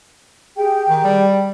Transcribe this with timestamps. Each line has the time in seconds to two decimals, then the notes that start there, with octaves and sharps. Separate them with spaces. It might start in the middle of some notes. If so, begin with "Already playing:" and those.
0.56 G4 G#4 G5
0.89 D#3
1.04 G3